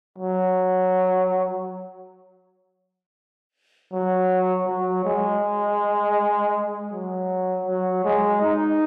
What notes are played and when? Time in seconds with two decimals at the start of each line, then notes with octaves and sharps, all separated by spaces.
0.18 F#3
3.92 F#3
4.67 F#3
5.05 G#3
6.92 F#3
7.66 F#3
8.04 G#3
8.41 D#4